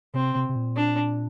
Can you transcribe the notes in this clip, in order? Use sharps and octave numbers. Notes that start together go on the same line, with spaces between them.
C3 C4
C3
C3
A#2
D4